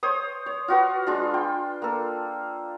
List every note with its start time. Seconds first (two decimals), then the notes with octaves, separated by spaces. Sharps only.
0.03 C5 C#5 D#6
0.46 C#5
0.68 F4 F#4 B4
1.07 G#3 D4 F4
1.34 G5
1.82 A#3 A4